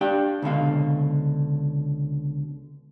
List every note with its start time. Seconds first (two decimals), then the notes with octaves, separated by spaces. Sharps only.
0.01 D4 G4 D5 F5 G5
0.42 C#2 B2 D3 F5